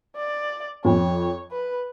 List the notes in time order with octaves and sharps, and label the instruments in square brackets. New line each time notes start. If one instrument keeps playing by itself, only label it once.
[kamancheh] D5
[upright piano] F2 [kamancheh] C#5
[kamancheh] B4